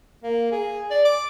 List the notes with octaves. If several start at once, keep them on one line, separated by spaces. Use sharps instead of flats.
A#3
G#4
D5
D6